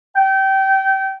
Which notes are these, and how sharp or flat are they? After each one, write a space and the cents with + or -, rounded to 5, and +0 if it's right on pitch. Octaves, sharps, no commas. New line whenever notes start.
G5 -25